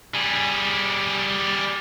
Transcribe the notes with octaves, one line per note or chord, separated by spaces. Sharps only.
G3 G#4